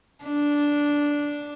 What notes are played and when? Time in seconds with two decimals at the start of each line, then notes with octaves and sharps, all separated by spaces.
0.24 D4